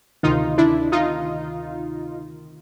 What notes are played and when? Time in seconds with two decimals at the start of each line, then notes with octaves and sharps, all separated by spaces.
0.23 D2 C3 D#3 D#4 F4
0.58 D4 E4
0.92 D#4 F4